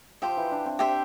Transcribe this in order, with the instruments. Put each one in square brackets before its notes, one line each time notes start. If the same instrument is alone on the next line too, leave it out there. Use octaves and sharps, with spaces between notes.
[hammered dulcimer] F3 [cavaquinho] G4 C5 E5
[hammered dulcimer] E3
D4
C4
[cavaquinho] G4 C5 E5